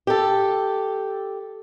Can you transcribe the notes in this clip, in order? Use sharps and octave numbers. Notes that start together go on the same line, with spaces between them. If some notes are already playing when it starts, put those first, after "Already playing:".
G4 A4